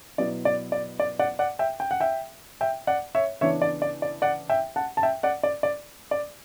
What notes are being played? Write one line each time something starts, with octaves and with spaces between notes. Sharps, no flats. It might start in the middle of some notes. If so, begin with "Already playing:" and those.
B2 F#3 B3 E4 D5
D5
D5
D5
D5 F#5
D5 F#5
E5 G5
G5
F#5
E5 G5
E5 G5
D5 F#5
C#5 E5
C#3 E3 B3 D4 C#5 E5
D5
D5
D5
D5 F#5
E5 G5
F#5 A5
A5
E5 G5
D5 F#5
D5
D5
D5